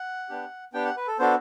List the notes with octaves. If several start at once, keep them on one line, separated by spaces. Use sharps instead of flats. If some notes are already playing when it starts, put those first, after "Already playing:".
Already playing: F#5
B3 D4 G4
B3 D4 G4 G5
F#5
B4
A4
B3 D4 F#4 A4 C5